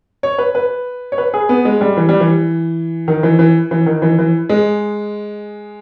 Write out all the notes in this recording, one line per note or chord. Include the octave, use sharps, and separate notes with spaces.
C#5
B4
B4
C#5
B4
G#4
B3
G#3
G3
E3
G3
E3
D#3
E3
E3
E3
D#3
E3
E3
G#3